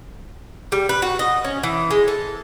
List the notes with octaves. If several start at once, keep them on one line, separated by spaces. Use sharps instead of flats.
G3
B4
F#4
D#5
C#4
E3
G#3
A4